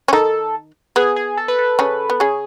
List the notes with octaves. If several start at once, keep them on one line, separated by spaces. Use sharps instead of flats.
C#4
D#3 D#4 A4
B3 G#4
G#4
A4
B4
A4
C#3 C#4
B3
C#3 C#4 G#4